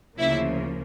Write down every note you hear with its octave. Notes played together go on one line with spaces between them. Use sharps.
D2 C#3 F3 A#3 E4 E5